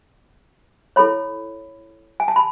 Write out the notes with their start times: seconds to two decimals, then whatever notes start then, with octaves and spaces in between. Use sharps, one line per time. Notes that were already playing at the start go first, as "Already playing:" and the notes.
0.96 E4 A4 C#5 B5
2.20 G#5
2.28 A5
2.36 B5